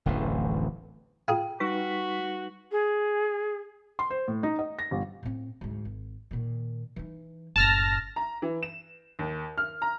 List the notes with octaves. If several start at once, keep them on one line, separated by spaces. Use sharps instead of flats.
D1 A1 F2 E3
F4 G#4 G5
G3 D#4 F#4 B4 C#6 B6
G#4
C6
C5
A2
D#4
D#5
A#6
G1
A2 C4
D2 G#2
G#1
A#2 D#3
E3 D#4
F#1 A2 A5 F6 A#6
A#5
E3
E7
D#2
F6
A#5